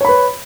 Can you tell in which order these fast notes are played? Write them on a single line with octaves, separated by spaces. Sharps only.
C#5 B5 B4